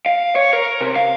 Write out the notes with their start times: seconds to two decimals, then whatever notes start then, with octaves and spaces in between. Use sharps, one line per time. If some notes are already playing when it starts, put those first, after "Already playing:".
0.06 F5
0.36 C#5
0.53 A#4
0.81 C3
0.96 F5